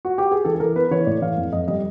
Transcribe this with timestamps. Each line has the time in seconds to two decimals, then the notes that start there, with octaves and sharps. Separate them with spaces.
0.05 F#4
0.18 G4
0.31 G#4
0.45 E3 A4
0.55 A4
0.60 E3 A#4
0.76 B3 B4
0.91 E3 C#5
1.06 A2 D5
1.22 E3 F5
1.37 F2
1.53 F2 D#5
1.68 G3 D#5